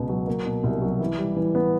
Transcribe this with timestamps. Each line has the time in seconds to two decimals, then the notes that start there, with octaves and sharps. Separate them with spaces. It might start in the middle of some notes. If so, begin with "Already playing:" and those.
Already playing: C#2 B2 B3
0.09 F#3
0.27 A#3
0.46 B2
0.64 C2
0.82 F#3
1.00 E3
1.18 G3
1.36 E3
1.55 B3